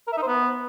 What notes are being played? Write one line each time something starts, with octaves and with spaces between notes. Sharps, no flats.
A#4
E5
D#4
C5
B3